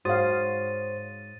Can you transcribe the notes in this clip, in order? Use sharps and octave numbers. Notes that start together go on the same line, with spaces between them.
G#2 F#4 C5 C#5 F5 D#6 A6 D#7